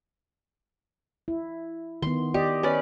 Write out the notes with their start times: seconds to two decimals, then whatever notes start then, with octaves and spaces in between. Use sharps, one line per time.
1.28 E4
2.02 D#3 B3 C6
2.34 G4 D5 D#5
2.63 C#4 B4 D5